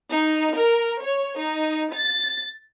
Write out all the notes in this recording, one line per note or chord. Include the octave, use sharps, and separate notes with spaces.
D#4
A#4
C#5
D#4
A6